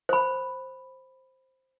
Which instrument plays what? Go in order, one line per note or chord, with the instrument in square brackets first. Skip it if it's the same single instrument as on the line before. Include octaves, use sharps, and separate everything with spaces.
[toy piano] C5 B5